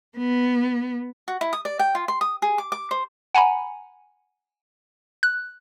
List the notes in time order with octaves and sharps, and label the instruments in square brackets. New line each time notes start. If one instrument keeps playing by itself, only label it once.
[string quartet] B3
[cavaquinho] F#4
E4
D#6
D5
G5
F4
C6
D#6
G#4
D6
D6
C5
[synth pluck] F#5 G#5 A#5 B5
F#6